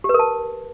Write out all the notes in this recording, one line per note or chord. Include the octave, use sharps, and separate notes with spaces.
G4
B4
A#4
A5